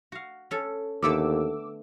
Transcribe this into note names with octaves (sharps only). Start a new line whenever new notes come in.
F#4 F5
C#4 A4
D#2 D3 A3 B3 D6 E6